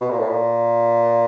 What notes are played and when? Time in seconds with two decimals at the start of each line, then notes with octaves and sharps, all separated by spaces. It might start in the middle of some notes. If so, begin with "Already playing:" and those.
0.01 B2
0.10 A#2
0.19 A2
0.30 A#2